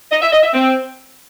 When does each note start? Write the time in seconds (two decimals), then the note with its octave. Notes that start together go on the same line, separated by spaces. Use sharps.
0.12 D#5
0.22 E5
0.33 D#5
0.43 E5
0.54 C4